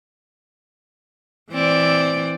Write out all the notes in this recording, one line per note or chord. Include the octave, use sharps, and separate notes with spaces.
E3 C4 D5